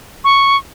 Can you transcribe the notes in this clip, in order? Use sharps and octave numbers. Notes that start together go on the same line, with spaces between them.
C#6